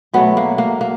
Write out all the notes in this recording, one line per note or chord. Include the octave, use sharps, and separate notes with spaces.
B2 F#3 A3 B3
A#3
A#3
A#3